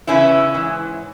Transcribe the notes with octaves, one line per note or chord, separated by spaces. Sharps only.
E2 C#3 E3 C#4 E4
G#2 E3